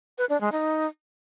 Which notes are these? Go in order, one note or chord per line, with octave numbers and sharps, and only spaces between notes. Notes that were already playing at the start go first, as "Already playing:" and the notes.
B4
D4
G#3
D#4